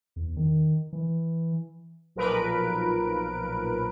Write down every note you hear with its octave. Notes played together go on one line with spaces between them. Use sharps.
E2
D#3
E3
B1 A#2 F3 A#4 B4 D7